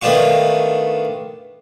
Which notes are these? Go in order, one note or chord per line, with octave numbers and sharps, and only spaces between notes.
D#3 A3 B3 D4 F4 C#6